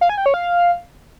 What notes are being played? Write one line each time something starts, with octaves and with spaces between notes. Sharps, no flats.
F5
G#5
G5
C#5
F5